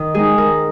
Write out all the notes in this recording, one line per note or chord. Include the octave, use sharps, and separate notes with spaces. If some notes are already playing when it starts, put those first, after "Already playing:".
Already playing: D#3
G#3 C4 D#4 G#4
D#3 A#4